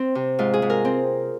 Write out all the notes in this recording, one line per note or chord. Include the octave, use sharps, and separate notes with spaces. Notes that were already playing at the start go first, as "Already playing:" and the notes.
Already playing: C4
C3
G#2 F4
G#4
G#2
A#4
C4